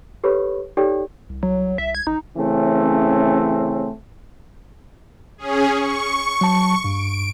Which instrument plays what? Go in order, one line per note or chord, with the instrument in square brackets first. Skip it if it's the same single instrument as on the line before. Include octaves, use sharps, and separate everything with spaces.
[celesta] G4 A4 B4 C#5 B5 C#6
D#4 G4 A4 C#5 D5 G5
[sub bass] C2
[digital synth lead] F#3
[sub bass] C2 [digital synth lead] E5
[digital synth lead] G#6
[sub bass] A1 [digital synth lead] D#4
[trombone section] C#3 E3 A3 C4 C#4
[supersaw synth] C#4 G#4
C#6
[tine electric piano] F#3 A5
[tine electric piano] G2 [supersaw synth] D7